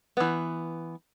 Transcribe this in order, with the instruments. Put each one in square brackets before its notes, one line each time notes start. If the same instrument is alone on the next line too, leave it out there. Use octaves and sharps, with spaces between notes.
[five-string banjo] E3 B3